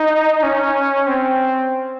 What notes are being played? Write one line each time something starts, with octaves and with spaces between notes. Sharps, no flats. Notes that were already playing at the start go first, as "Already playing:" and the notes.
Already playing: D#4
C#4
C4